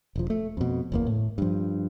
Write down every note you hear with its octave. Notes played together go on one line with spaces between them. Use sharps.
E1 F3
A3
F2 B2
F#1 E2 A#3
A2
G2 F3